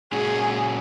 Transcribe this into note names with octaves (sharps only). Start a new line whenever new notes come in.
A#2 G#3 C#4 F#4 G#4